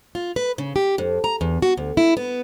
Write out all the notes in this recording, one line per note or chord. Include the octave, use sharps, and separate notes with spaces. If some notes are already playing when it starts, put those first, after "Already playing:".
F4
B4
C#3
G4
F2
A#5
E2
F#4
D2
E4
B3